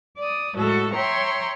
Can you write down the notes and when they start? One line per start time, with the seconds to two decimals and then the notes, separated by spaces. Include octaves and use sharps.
0.18 D5 D#6
0.54 A2 G#3 F#4 A4
0.92 C#5 E5 G5 A#5 C6 C#6